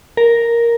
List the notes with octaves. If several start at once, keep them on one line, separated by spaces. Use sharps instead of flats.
A#4